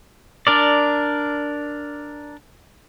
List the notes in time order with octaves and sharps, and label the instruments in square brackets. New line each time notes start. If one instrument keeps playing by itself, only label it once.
[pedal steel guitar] D4 A#4 D5